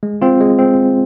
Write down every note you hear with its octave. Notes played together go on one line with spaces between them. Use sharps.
G#3
C4 F4
G#3
C4